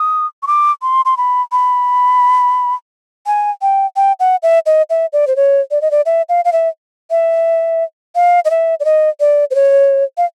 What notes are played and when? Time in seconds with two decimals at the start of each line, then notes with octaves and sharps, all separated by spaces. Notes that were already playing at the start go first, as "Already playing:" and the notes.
Already playing: D#6
0.43 C#6
0.47 D6
0.82 C6
1.05 C6
1.17 B5
1.52 B5
3.26 G#5
3.62 G5
3.96 G5
4.20 F#5
4.43 E5
4.66 D#5
4.90 E5
5.13 D5
5.27 C5
5.36 C#5
5.71 D5
5.82 D#5
5.91 D5
6.06 E5
6.29 F5
6.45 F5
6.53 E5
7.11 E5
8.15 F5
8.45 D#5
8.50 E5
8.80 D5
8.85 D#5
9.20 D5
9.51 C5
9.55 C#5
10.17 F5